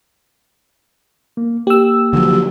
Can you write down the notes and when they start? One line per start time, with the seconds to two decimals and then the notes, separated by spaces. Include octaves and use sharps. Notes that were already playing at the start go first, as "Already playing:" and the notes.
1.37 A#3
1.67 A#3 G4 E6
2.13 D3 F3 F#3